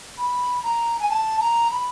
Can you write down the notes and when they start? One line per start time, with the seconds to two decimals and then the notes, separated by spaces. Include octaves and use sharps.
0.17 B5
0.63 A#5
0.99 G#5
1.09 A5
1.40 A#5
1.70 B5